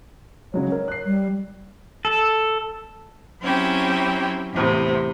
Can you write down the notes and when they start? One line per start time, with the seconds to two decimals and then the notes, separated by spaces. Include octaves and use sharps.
0.54 C#3 F#3 G#3 C#5
0.72 A#4
0.88 F#6 C7
1.05 G3
2.05 A4
3.41 F#3 C4 C#4 E4 G4
4.53 E2 A2 C3